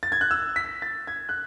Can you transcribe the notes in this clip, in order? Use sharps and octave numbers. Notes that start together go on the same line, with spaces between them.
A6
G#6
F#6
E6
B6
A6
G#6
F#6